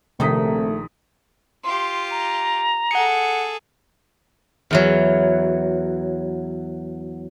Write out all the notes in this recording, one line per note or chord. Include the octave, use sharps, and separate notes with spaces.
A#1 C3 D#3 A3 D#4 D#6 B6
F4 G4 C6
A#5
G#4 A4 F#5 C#7
E2 E3 F#3